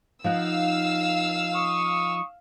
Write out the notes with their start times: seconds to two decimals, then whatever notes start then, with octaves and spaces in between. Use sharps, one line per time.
0.24 F3 D#4 F5 F#5 E6
1.55 C#6 D#6